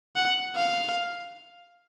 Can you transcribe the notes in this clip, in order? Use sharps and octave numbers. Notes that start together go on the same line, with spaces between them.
F#5
F5